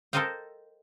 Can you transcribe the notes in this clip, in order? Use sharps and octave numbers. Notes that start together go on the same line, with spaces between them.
A4 A#4 C5 D#5 F5 G5